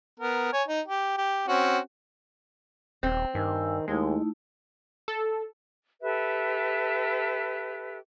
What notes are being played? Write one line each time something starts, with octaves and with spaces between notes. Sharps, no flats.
B3 A#4
C#5 G#5
D#4
G4
G4
C4 C#4 F#4
D#1 C4
G2 D#3 G#5 E6
D#2 G#3 A3 D#4 E4
A4
G4 A4 B4 E5